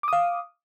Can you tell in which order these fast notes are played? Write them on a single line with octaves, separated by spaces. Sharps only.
D6 D#6 F5